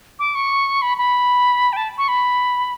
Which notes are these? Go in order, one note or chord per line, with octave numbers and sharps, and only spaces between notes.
D6
C#6
B5
B5
G5
A5
C#6
B5